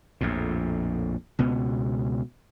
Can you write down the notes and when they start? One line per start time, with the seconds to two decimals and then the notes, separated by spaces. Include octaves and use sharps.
0.21 A#1 F2 A2
1.39 C#2 B2 B3